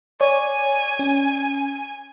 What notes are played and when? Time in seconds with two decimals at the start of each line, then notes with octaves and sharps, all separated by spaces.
0.21 C#5 D5 G#5
0.99 C#4